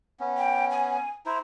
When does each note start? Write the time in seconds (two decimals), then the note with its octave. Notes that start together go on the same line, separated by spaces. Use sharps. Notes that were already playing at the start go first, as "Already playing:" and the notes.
0.20 B3 C#4
0.38 G5
0.71 G#5
1.26 E4 C5 A#5